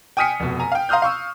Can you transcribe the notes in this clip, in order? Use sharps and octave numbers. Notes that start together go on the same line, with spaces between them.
G5 G#5 D#6 F6 B6 C#7
F1 B2
G#5 A#5
F5 G5
F5 A#5 C6 D#6 F6 G6
F5 C#6 E6